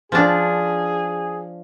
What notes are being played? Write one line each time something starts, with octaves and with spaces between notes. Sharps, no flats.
F3 D4 G#4